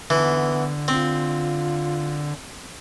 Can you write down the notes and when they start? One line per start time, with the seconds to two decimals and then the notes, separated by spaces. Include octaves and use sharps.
0.10 D3 E3 B3
0.88 C4 F4